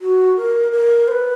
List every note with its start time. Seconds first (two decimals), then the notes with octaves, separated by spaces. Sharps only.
0.01 F#4
0.37 A#4
0.72 A#4
1.08 C5
1.12 B4